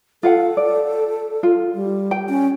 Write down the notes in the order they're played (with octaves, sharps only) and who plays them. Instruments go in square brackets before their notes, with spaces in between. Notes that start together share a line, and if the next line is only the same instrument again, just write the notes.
[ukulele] F4 F5 F#5 [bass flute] A4
[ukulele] D5
F4
[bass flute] G3
[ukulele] G5
[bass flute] C#4